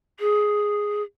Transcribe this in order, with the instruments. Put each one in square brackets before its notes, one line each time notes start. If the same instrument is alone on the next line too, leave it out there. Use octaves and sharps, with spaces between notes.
[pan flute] G#4